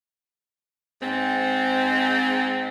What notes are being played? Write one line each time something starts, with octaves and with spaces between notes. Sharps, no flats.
G#2 C4